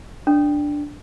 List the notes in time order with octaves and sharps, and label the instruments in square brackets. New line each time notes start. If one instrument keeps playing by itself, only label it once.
[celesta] D4